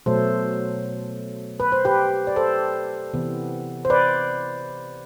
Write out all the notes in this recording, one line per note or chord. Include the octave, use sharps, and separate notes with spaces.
B2 F#3 A3 A4 C5
B4
C5
G4 B4
D5
A4 C5
C3 E3 B3
C5
B4 D5